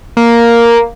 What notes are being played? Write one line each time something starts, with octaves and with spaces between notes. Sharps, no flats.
A#3